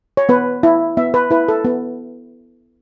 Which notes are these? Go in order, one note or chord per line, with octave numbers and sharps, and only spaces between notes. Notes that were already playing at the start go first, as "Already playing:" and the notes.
C#5
B3 B4
E4
B3 E5
B4
E4 B4
A4
B3